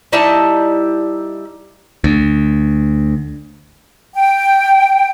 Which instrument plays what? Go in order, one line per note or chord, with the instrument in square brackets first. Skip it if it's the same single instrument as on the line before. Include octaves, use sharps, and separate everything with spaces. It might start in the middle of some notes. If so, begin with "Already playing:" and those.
[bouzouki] G3 D#4 E4 A5
[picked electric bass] D2
[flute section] G5